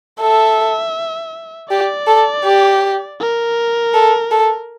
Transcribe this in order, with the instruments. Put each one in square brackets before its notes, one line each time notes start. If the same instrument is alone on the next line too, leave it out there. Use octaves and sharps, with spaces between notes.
[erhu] A4 [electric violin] E5
[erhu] G4 [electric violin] D5
[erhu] A4
G4
[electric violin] A#4
[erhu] A4
A4